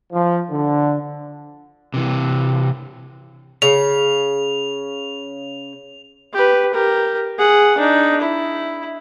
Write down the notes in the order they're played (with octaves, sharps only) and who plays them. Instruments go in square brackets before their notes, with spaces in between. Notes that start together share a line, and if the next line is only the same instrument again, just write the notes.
[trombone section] F3
D3
[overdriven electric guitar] C3 E3
[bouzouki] C#3 [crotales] F7
[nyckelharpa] G4 B4
G4 A#4
G#4 F#5
D4 D#4
E4